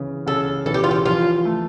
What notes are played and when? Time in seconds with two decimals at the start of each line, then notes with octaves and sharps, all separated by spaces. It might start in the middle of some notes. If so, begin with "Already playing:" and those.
Already playing: C#3 E3
0.26 C#3 A4
0.66 E3 A4
0.74 G4
0.84 F4
0.91 G4
1.06 F3 F4
1.45 A3